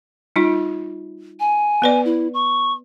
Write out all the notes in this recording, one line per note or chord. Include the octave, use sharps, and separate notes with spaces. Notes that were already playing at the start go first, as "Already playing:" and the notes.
G3 D#4 F4
G#5
B3 B4 D5
E4
C#6